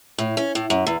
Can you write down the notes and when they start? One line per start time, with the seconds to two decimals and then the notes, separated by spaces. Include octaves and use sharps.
0.18 A2
0.37 C#4
0.55 A2
0.70 F#2
0.87 E2